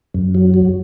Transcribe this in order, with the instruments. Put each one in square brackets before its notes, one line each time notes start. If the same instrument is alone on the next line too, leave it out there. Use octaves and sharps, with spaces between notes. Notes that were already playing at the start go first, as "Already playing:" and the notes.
[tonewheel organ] F#2
F#3
F#3